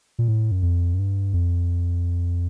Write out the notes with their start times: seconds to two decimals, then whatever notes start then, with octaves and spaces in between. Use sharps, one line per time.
0.19 A#2
0.28 A2
0.51 F#2
0.62 F2
0.94 F#2
0.99 G2
1.33 F2